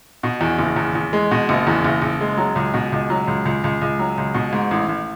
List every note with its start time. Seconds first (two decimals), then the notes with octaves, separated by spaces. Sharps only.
0.23 B2
0.41 E2
0.59 F#1
0.76 E2
0.95 E2
1.13 G#3
1.31 B2
1.49 F#1
1.67 E2
1.84 F#1
2.02 F#1
2.21 G#3
2.38 F#3
2.56 C#2
2.74 B2
2.92 C#2
3.10 F#3
3.28 C#2
3.45 C#2
3.64 C#2
3.81 C#2
3.99 F#3
4.18 C#2
4.34 B2
4.53 G#2
4.71 A1
4.89 A1